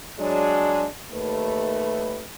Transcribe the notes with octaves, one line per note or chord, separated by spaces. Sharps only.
F#3 G#3 D4
D#2 A3 B4